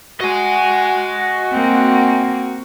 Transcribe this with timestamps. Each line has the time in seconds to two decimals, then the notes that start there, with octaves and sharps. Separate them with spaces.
0.20 F#4 D#5 G#5
1.52 A#3 C4